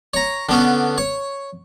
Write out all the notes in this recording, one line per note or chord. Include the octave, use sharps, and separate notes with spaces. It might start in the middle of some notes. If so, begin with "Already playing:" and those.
C#5 A#5
D3 B3 C#4
C#5